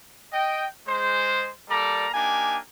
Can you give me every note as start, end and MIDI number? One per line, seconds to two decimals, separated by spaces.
0.33 0.66 75
0.33 0.66 79
0.87 1.50 56
0.87 1.50 72
1.69 2.08 55
1.69 2.08 58
1.69 2.08 69
1.69 2.08 74
1.69 2.08 82
2.14 2.58 58
2.14 2.58 62
2.14 2.58 63
2.14 2.58 67
2.14 2.58 80